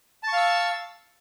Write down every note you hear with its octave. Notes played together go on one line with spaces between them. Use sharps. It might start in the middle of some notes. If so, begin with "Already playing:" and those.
F5 A5 C#6 E6